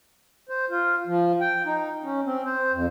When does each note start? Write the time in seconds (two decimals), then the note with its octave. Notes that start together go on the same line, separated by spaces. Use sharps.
0.49 C5
0.70 F4
1.07 F3
1.41 G5
1.66 D#4
2.04 C#4
2.26 C4
2.45 C5
2.73 F2